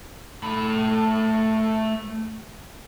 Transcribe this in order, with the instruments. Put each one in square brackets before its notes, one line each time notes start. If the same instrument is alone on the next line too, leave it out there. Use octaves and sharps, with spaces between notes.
[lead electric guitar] A3 B5